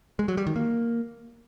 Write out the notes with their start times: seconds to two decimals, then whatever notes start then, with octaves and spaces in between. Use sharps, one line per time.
0.19 G#3
0.28 F#3
0.37 G3
0.47 D#3
0.56 A#3